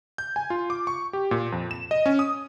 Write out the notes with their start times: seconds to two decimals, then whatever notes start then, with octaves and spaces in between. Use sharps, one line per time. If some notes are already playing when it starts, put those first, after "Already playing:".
0.18 G6
0.36 G#5
0.50 F4
0.70 D6
0.87 C#6
1.13 G4
1.31 A#2
1.52 F2
1.71 E7
1.91 D#5
2.06 C#4
2.19 D#6